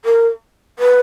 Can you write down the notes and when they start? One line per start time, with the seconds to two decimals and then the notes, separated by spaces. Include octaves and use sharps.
0.05 A#4
0.79 B4